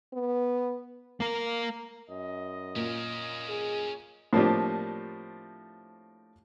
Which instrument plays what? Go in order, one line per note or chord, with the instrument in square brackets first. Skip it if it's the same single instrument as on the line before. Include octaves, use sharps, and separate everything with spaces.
[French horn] B3
[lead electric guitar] A#3 A#4
[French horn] F#2 [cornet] D#5
[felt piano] A#2 [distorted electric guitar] C#4 A#4
[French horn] G#4
[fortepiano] A2 F3 A#3 C4 D4 G4